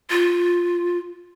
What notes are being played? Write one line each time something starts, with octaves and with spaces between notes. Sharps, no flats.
F4